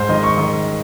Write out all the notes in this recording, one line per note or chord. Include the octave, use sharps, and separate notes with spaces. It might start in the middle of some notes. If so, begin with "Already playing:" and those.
Already playing: G#2 C5
D#3 D#5
C#6
D#3